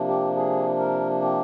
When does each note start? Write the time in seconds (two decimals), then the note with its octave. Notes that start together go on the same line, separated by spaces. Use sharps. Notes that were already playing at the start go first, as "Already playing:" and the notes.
Already playing: C3 F3 A#3 D4
0.08 G4
0.37 G#4
0.79 A#4
1.22 G4